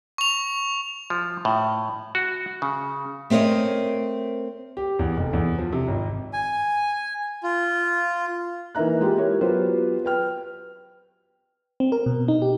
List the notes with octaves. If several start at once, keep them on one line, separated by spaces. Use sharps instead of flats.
C#6 F7
F3
A2
F#4
C#3
A3 C4 A#4 C#5 D#5
G4
E2
F1
E2
F3
C3
G#1
G#5
F4
E3 A#3 D#4 E5 A#5 F#6
G#3 F4 G4
E4 G4 A#4 C#5
F#3 B3 F4 G4 B4 C5
B4 G5 F6
C4
A#4
B2
D#4
G4